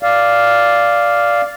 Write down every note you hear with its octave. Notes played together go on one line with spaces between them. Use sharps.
D5 F5